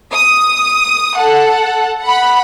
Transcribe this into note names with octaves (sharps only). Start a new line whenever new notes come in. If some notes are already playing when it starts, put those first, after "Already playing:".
D#6
A4 F#5
F#5 B5